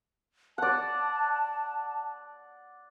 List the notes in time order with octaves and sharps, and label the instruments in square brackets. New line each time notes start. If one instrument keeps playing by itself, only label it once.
[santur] D5 F#5 [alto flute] A5